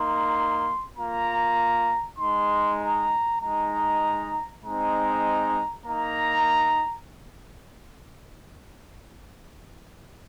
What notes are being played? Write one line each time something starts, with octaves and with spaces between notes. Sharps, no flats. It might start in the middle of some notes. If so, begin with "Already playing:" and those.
Already playing: A#3 D#4 C6
A#3 F4 A#5
G#3 D#4 C6
A#5
G#3 D#4 A#5
G#3 C4 D#4 A#5
A#3 D#4 A#5